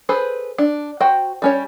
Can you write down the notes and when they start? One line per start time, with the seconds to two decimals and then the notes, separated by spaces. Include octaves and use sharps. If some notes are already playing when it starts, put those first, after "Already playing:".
0.09 G#4 A4 B4 C5
0.58 D4
1.00 F#4 C5 G5
1.42 G3 C#4 C#5